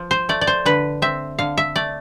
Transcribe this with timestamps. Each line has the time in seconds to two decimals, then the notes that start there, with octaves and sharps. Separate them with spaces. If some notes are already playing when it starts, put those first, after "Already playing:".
Already playing: F3
0.11 C5
0.29 A3 D5
0.41 D5
0.47 C5
0.66 D3 B4
1.02 C4 E5
1.39 D3 F5
1.57 E5
1.76 A3 D5